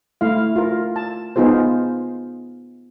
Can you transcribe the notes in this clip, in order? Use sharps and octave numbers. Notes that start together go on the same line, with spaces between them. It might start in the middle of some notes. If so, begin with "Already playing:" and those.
A3 E4 F5
F4 A#4
A5
B3 D#4 F4 G#4 C5